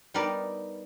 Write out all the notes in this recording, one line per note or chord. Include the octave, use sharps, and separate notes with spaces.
G3 B3 D#4 A#4 D5